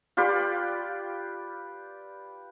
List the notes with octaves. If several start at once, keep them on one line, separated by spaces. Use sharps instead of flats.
F4 G4 B4 D5